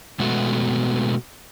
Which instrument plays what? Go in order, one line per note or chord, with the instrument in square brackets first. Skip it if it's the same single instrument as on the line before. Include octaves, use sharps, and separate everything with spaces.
[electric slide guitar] B2 G#3 A3 B3 F#4